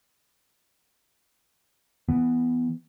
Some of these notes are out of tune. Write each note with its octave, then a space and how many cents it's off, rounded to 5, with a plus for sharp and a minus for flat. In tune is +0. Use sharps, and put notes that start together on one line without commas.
E3 +10 B3 +0